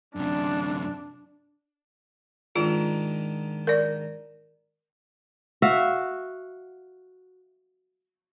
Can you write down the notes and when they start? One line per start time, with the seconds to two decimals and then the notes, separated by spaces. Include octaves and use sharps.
0.16 F#2 C3 D4
2.56 G#2 D#3 D4 F4
3.67 A#4 D5
5.62 F#4 E5 F5